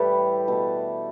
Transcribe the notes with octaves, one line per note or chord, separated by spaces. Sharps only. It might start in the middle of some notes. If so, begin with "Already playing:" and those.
Already playing: A2 E3 G3 G4 A4 B4
B2 A3 A4